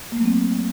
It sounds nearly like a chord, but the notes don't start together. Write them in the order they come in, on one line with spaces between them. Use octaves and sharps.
A#3 A3 F#3 C4